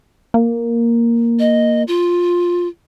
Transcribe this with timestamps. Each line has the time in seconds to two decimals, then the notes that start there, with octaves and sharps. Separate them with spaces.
0.34 A#3
1.39 D#5
1.88 F4